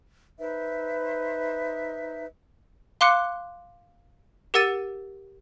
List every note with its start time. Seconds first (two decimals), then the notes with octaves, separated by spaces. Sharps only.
0.39 D#4 B4 C5 E5
3.01 F5 C6 D6 F#6 C#7
4.54 G4 A#4 F#5 E6 A6 D#7